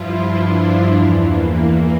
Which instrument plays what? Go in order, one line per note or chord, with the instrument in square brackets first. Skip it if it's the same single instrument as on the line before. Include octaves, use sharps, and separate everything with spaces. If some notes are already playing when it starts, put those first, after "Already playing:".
Already playing: [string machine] G2 F3 E4 F4
D4
E2 E3
A#3
A#3